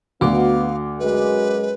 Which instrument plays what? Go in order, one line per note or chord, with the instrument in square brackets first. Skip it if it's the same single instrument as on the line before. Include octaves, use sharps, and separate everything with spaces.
[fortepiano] D2 [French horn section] B3 [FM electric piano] F#4 D6 [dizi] F5
[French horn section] F#2 G#3 [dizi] B4